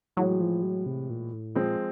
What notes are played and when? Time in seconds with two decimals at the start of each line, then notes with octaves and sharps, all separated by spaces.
0.17 A2 E3 F#3 G#3
0.40 F3
0.63 F#3
0.86 C3
1.10 A#2
1.33 A2
1.55 A#2 F3 G#3 C4